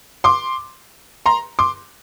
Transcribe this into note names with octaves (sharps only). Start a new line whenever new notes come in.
C6 D6
A#5 C6
C6 D6